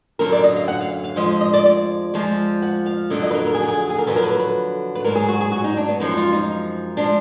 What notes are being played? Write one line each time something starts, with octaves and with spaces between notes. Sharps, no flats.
F#2 D3 F#3 A#4
D5
D#5
F5
F#5
F5
F5
F2 F3 G#3 D#5
D#5
D5
D5
F2 F3 G#3
F#5
F5
F2 D3 F#3 D#5
D#5
B4
A#4
A#4
G#4
F#4
G#4
G#4
A#4
F2 D3 F#3 B4
A#4
B4
B4
B4
G#2 F#3 A#4
G#4
F#4
G#4
F#4
D#4
D4
B3
F#2 F3 G#3 D#4
F4
D#4
F3 G#3 D4